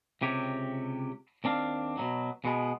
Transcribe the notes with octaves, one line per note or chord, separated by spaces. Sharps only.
C#2 C3 G4 C#5
D#2 C4 D4 F5
B2 D#3 F#3
B2 G#3 B3